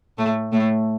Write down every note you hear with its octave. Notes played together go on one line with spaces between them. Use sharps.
A2 A3
A2 A3